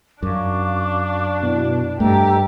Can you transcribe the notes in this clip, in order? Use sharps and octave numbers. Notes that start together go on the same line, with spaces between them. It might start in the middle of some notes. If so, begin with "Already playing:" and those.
F#2 D4 F5 C#6 D6
B2 E4
G2 A3 G4 A4 D#5 A#5